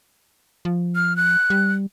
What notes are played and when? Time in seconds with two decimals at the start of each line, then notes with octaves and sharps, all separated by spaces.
0.65 F3
0.95 F6
1.17 F#6
1.50 G3